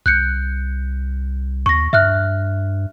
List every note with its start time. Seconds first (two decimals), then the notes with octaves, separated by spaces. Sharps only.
0.06 C2 F#6 G6 C#7
1.66 D#2 C#6 A#6
1.93 G2 E5 F6 F#6